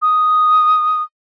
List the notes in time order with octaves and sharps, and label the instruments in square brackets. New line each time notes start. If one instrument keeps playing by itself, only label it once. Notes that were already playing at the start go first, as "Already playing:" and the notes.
[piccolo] D#6